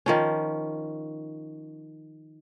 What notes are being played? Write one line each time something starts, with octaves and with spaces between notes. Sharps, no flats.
D#3 F3 C#4